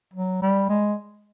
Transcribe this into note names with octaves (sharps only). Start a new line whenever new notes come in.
F#3
G3
G#3